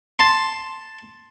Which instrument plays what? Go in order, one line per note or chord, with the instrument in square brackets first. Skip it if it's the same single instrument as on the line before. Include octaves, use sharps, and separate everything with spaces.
[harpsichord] A5 C6